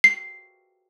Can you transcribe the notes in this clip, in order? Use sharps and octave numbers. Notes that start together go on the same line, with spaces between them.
C7